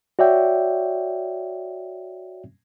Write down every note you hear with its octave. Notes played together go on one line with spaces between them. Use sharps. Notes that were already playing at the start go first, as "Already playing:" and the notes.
F#4 C#5 D5 E5 G5